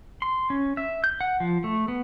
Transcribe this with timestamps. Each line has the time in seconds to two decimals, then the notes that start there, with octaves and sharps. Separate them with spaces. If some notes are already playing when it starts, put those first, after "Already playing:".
0.22 C6
0.50 C#4
0.77 E5
1.04 G6
1.21 F#5
1.40 F3
1.64 A3
1.88 B3